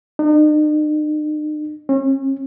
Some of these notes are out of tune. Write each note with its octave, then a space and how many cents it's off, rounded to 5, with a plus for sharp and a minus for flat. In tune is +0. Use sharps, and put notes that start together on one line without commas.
D#4 -45
C#4 -35